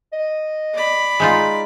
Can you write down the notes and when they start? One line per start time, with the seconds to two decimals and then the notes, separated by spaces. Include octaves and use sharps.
0.13 D#5
0.74 D5 B5
1.20 G#3 D#4 F4